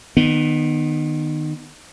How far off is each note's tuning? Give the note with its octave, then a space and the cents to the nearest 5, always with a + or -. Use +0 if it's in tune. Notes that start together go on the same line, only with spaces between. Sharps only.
D#3 -25 B3 +0